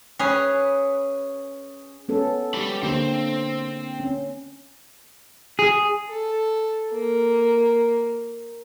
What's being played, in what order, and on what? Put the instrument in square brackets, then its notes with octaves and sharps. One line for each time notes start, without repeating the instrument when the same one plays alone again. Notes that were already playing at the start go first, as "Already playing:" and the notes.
[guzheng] C#4 G#4 B4
[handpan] B3 C#4 A4
[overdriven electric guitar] G4 B5
[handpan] D3 A#3 [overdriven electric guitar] C4 C5
[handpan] C#4
[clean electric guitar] G#4
[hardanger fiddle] A4
A#3